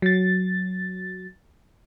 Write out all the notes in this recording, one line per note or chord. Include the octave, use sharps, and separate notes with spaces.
F#3 A6